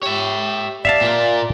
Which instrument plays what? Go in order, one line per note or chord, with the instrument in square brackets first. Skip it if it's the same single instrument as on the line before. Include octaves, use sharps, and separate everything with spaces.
[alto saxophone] G4 [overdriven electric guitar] C#5 E5
[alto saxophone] D5 [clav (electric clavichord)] E5 F5 A5
[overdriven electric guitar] A#2 A#3